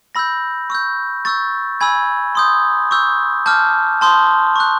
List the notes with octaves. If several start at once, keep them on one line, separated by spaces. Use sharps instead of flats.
B5 E6 G6 A#6
C#6 E6 G6
C#6 E6 G6 A6
G#5 B5 E6 G#6
C6 D#6 G6
C#6 E6 G6
A5 D6 F6 G6
A5 C6 D#6 G6
C#6 F#6